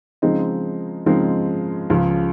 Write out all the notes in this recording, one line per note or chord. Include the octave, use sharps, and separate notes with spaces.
C#3 F3 G#3 C4 D#4
C#3 F3 G#3 C4 D#4
C#2 C#3 F3